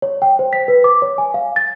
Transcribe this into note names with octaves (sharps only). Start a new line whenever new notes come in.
C#5
G5
C5
B6
B4
D6
C#5
G#5
F5
A6